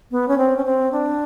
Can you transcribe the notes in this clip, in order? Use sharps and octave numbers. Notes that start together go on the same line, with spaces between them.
B3
C#4
C4
C#4
C4
D4